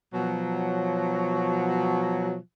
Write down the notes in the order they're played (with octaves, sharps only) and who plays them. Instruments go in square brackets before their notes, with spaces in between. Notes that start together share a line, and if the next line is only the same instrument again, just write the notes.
[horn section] B2 F3 F#3